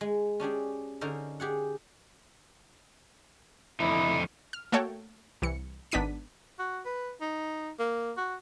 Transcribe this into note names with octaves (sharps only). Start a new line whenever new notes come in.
G#3
C#4 D4 G4 G#4
D3 C#4 D#4 A#4 C5
G4 G#4 F#5
F2 D3 D#4 E4
F6
A3 A#3 F#4 A4 C#5 G5
C2 E3 C#7
G#1 B3 D4 D#4 B6 D#7
F#4
B4
D#4
A#3
F#4